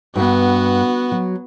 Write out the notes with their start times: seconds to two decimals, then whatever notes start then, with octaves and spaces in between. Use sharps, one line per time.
0.16 G2 B3 F#4
1.12 F#3